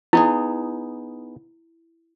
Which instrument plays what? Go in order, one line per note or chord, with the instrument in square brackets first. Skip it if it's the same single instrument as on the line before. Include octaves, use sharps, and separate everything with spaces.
[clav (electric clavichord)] B3 D#4 G#4 [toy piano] E4